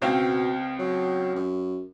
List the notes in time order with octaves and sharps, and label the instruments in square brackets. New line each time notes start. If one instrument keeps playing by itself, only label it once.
[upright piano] C#2 C4 F5 [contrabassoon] B2
[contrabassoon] F#3
F#2